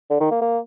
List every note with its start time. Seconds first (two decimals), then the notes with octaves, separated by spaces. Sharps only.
0.10 D3
0.20 D#3
0.31 A#3
0.42 A#3